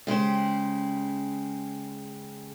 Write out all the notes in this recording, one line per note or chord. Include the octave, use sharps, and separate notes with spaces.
C#3 G#3 G4 C5